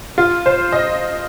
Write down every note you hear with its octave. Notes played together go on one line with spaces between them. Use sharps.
F4
C5
D#5